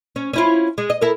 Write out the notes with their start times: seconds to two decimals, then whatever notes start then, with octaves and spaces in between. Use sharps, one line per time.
0.16 C#4
0.33 C#4 E4 F4
0.78 G#3
0.90 D#5
1.02 E4 A4 A#4